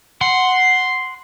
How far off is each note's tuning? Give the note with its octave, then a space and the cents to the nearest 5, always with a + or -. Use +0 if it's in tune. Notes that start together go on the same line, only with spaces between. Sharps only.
F#5 +0 C6 +0